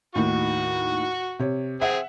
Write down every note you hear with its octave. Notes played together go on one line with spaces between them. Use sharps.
D#2 A2 D#3 F#4 C#6
C3 C#5
C4 G#4 E5 F#5